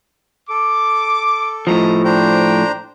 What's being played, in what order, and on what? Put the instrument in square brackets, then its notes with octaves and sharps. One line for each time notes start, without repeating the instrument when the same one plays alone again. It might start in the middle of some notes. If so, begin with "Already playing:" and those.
[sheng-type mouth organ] A4 [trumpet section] D6
[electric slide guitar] A2 F3 [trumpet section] D#5 A5 A#5
[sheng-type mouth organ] D4 C5 A#5 [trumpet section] G5